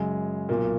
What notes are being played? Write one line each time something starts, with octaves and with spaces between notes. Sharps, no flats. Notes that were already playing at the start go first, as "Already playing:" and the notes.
Already playing: F#2 C#3 G#3
B1 A#2 A#3